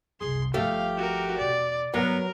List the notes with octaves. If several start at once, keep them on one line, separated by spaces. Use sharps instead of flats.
F#1 C2 G#4 C6
G1 F3 A3 G4 F5
F#4 A#4
E2 B2 D5
G2 F#3 B3 F4 A#4